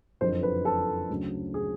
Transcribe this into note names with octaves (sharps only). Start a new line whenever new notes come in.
F#1 F2 D3 C5
B4
A4
D2 C#3 F#3
G#4